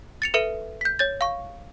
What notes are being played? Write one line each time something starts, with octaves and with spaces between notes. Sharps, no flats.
A6 C#7 F7
A4 B4 E5 C#7 D#7 F#7
G6 B6
C#5 G6 A6
F5 C#6